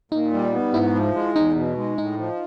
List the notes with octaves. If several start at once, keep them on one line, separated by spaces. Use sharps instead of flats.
A#2 D#4
G3
B3
G#2 E4
F3
G#3
E2 D#4
B2
G#3
A2 D#4
F3